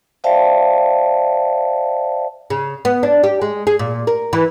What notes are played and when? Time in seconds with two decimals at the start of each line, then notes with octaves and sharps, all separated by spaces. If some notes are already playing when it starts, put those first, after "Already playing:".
0.24 C5 D5 E5 F5 G5 A5
2.50 C#3
2.85 B3
3.03 D4
3.24 G4
3.42 G#3
3.67 G#4
3.79 A#2
4.07 A#4
4.33 E3